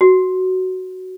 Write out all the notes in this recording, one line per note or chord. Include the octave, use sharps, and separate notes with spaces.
F#4